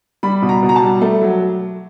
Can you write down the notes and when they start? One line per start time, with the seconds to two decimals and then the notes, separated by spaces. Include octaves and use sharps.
0.23 G3 B5
0.42 B2
0.49 A#5
0.63 B2
0.69 A#5
0.76 A5
0.82 G3
1.01 A3
1.22 F#3